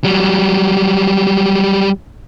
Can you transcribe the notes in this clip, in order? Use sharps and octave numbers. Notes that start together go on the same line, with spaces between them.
F#3 G3